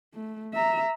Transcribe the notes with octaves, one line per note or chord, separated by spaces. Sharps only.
A3
E5 A#5